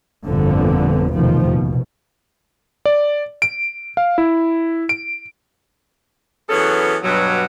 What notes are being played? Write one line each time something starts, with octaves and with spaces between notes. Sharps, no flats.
G1 F2 A#2 D3 F3 B3
F1 B1 E2 B2 D#3 F3
A#1 B2
D5
D7
F5
E4
D7
E3 F#3 B3 C#4 G#4 A4
G2 B2 F#3